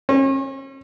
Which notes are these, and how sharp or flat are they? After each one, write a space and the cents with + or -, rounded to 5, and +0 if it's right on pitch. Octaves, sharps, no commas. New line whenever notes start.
C#4 -40